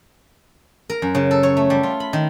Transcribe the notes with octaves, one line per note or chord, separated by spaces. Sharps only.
A#4
F#2
C#3
A4
C#5
A3
G3
F4
B5
D#3